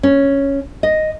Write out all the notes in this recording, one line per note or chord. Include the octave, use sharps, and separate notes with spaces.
C#4
D#5